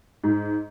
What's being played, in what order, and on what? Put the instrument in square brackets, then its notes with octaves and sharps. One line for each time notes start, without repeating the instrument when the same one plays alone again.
[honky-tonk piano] G#2